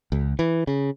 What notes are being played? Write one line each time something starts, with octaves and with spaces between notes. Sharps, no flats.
C#2
E3
C#3